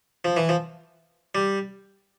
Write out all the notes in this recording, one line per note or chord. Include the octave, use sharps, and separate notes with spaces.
F3
E3
F3
G3